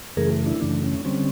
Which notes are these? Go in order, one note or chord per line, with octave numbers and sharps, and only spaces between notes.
F#2 C#3 E3 A3 G#4 A#4
D4 E4
F#2 C#3 E3 A3 D4
C#4
D3 G3 C4 C#4